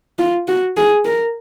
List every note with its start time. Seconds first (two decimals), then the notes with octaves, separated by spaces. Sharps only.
0.19 F4
0.48 F#4
0.77 G#4
1.05 A#4